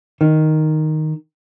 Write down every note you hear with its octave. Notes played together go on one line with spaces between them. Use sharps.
D#3